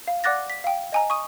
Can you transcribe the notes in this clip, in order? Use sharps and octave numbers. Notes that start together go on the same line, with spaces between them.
F5
D5 F#5 D6 F#6 A6 A#6
B6
F5 G5
D#5 G#5 A#5
C#6 D#6 D#7